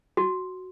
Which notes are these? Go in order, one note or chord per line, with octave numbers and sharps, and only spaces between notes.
F#4